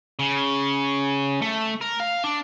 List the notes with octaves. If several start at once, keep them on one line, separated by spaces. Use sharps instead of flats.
C#3
A3
A#4
F5
D4